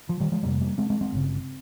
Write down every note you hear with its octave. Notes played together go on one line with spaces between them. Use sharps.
F3
D#3 G3
F3 G#3
F1 F2 C3 G3 A#3
G3 A#3
G#3 C4
G#3 C4
G#3 C4
G1 F2 C#3